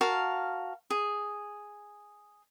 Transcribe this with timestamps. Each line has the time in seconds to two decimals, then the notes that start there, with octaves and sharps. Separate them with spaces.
0.01 F#4 A#4 F5 A5
0.90 G#4